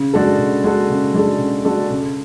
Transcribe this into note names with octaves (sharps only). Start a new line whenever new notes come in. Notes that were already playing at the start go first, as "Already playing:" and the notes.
Already playing: C#3
G#3 D4 F#4 A4
C#3
G#3 D4 F#4 A4
C#3
G#3 D4 F#4 A4
C#3
G#3 D4 F#4 A4
C#3